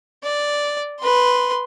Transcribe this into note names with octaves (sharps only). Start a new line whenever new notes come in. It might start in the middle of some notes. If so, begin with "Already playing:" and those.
D5
B4 C6